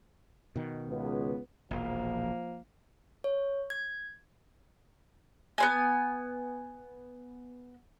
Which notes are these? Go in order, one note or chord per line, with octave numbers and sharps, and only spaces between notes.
B2 D#3
C#2 B3
E1 A#1 F3 A#3
C#5
G#6
B3 C4 G#5